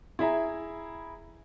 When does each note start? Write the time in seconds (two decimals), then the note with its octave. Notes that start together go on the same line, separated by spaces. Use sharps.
0.19 E4 G#4 E5 A#5